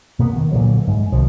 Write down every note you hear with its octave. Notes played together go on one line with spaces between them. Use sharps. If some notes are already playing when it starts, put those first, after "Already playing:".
B2 A#3 B3
D#3
A#2 D3 E3 F#3
G#2
C2 B2 D#3 F3